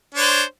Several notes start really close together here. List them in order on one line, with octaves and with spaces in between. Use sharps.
D4 C#5 C5